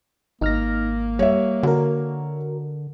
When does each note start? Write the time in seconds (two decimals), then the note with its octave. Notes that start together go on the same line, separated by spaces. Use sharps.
0.41 G#1 A#3 D#4 F6 A#6
1.19 G3 C#5 E5
1.63 D3 F#4 A#4